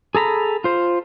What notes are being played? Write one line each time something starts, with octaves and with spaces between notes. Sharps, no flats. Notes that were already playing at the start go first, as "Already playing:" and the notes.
G#4 A4 A#5 B5
F4 C5